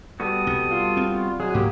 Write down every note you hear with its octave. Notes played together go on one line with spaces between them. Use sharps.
G3 B3 F#4 A4 D#6
C2
F4
C4
F#3 G#3 G#4
G#2 A#3 G4